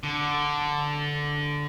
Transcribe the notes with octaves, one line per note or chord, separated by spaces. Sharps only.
D3